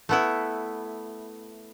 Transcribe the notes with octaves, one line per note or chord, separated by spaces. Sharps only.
A3 B3 E4